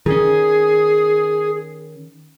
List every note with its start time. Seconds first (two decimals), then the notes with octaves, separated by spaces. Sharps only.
0.06 D#3 C#4 G#4